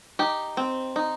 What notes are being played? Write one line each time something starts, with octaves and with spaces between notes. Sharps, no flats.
D#4 G4
C4
D#4